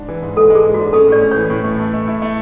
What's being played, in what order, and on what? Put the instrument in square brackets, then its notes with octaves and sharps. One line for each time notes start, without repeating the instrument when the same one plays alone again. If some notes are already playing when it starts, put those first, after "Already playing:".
Already playing: [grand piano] G#2 D4
E3
G#2
[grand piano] G#3 [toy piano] A4
[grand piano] G#3
[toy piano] G#4
[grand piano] G#2
[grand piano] D4 [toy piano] F#4
[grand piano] C#4 [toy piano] A4
[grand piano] A2 [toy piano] D5
[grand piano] C#4
[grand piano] E3 [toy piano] C#5
[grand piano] A2
A3
A3
A3
E4
A3